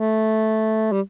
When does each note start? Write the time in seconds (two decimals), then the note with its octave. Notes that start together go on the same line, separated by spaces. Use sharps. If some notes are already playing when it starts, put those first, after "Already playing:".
Already playing: A3
0.92 G3